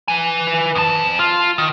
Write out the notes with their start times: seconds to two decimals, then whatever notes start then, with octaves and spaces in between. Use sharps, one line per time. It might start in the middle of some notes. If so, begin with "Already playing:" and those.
0.08 B4 G#5
0.75 F2 A5
1.19 F4
1.58 D#3